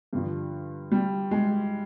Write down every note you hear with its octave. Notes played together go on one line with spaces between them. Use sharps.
G2 D3 F3
G3
G#3